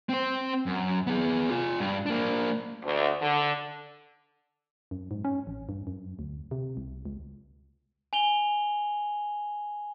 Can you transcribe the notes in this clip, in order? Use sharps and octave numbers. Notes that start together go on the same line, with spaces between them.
C4 C5
F#2
B3 G#4
F4 G#5
G2 D4
A#3 D4
D2
D3
F#2
G#2
C#4
A1
G2
F#2
D2
C3
C2
C#2
G#5 F7 G7